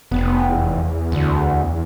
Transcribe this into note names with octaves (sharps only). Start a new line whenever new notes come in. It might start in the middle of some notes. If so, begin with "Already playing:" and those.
F1 B3
E2
D2